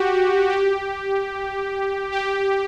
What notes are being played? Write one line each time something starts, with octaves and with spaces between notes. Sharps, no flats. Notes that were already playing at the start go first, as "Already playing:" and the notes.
Already playing: F#4 G4
G4
G4